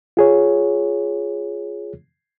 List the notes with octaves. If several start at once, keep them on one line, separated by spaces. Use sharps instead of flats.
F4 G#4 C#5